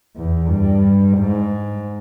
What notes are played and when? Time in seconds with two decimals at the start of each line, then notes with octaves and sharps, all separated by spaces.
0.16 E2
0.50 G2
1.17 G#2